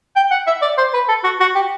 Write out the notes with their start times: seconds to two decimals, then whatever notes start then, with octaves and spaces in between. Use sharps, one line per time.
0.16 G5
0.31 F#5
0.47 E5
0.62 D5
0.77 C5
0.94 B4
1.09 A4
1.24 F#4
1.40 F#4
1.55 G4